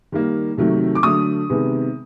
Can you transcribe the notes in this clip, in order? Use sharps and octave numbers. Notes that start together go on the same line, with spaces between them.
D#3 G3 A#3
C3 D#3 F#3 A3
D6
D3 F#3 A3 D#6
C3 D#3 G#3 B3